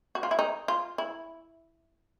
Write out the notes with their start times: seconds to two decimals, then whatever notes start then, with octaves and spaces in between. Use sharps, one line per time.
0.15 F#4
0.23 F4
0.31 E4
0.39 D#4
0.68 F4
0.98 E4